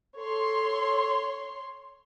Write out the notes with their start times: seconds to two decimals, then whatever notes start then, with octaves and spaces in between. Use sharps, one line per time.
0.17 A4 C#5 C6